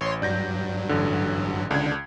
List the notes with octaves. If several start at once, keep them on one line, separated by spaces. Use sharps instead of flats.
A1 C#5 C6
G2 F#3 D5 G6 A#6
A1 D3
C#2 D3 D4 G#6